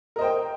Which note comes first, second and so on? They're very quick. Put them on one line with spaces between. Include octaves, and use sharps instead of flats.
A#4 D#5 C5 G5